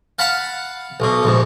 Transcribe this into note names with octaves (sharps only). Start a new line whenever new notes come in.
F5 F#5 A5 B5
B1 B2
A#1 G#2